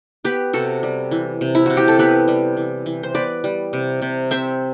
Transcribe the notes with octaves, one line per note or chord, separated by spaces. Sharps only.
B3 G4 B4
C3 F#4 A4
G3
E3
C3
E4
C3 F#4
G4
A4
B3 G4 B4
G3
E3
E3
C5
B3 B4 D5
G3
C3
C3
C4 C5 E5